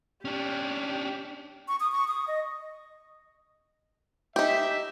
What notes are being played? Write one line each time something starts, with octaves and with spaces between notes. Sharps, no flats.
C#4 D4 G4
C#6
D#6
C#6
D#6
D#5
D#4 G4 E5